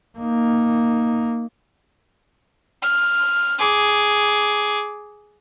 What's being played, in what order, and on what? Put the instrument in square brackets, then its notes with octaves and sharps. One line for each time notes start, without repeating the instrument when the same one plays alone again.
[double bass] A#3 D#4
[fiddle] F6
G#4 D6